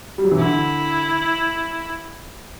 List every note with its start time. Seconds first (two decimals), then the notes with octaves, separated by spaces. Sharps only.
0.18 G3
0.25 F#3
0.31 E3
0.39 D3 E4